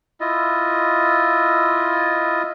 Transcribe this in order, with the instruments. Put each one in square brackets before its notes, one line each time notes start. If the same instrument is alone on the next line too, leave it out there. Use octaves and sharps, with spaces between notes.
[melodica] E4 F4 D#5